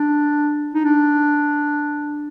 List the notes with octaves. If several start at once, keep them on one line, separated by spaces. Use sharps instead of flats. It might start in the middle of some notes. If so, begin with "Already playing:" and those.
Already playing: D4
D#4
D4